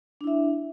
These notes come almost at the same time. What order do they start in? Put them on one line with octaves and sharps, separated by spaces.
D4 E4 E5